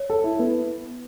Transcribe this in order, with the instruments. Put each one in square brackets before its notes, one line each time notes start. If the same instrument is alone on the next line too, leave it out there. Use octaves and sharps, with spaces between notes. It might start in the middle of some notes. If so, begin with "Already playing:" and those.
Already playing: [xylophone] C#5
[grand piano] A4
E4
B3